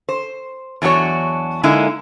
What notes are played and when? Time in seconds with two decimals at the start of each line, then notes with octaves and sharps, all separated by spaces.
0.09 C5
0.82 E2 F#3 D4 F#4 C#5
1.63 D3 G#3 A#3 D#4 E4